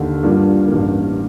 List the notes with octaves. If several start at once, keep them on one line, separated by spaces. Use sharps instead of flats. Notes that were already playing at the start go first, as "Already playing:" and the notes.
Already playing: D#2 D3
G2 F3 A#3 D4
A1 G2 D#3 A#3